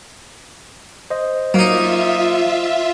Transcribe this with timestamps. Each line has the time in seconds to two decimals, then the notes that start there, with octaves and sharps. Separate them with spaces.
1.10 C5 D#5
1.54 F#3 A#3 D#4 F4 E5